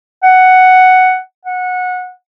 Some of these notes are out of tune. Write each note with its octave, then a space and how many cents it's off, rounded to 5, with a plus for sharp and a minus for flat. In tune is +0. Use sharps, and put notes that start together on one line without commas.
F#5 +5
F#5 -20